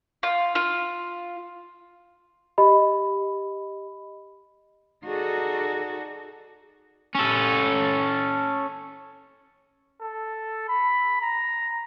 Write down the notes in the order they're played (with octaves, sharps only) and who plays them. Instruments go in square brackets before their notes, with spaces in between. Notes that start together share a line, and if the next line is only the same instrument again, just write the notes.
[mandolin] F4
F4
[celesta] G4 D#5 B5
[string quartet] D#4 F#4 G#4 A4 D5
[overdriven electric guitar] C#4 A4
[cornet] A4
B5
A#5